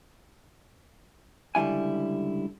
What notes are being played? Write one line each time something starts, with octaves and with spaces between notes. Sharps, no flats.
C#2 D3 G3 E4 G#5